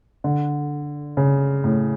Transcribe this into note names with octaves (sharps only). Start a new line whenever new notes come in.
D3
C#3
A2